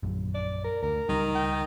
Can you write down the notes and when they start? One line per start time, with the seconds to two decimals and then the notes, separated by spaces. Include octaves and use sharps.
0.03 A#1 F#2
0.34 D5
0.64 A#4
0.83 D2 A#4
1.09 C#2 D#3 G3
1.35 G5